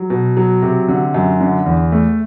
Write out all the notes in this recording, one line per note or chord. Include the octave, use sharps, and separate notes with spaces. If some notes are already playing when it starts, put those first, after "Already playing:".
Already playing: F#3
B2
F#3
C3
D3
F#2
D3
E2
A3